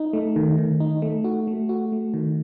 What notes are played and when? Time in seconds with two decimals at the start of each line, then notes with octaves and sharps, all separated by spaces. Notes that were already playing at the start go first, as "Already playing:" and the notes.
Already playing: D#4
0.13 A3
0.36 D#3
0.58 D#3
0.80 D#4
1.02 A3
1.24 F#4
1.47 A3
1.69 F#4
1.92 A3
2.14 D#3